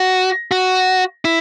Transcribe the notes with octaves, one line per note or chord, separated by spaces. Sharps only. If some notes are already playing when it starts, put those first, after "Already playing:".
Already playing: F#4
F#4
E4